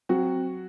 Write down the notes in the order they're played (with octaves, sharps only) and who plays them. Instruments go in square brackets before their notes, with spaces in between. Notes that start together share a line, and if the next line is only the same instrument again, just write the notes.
[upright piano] F#3 F#4 [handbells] C4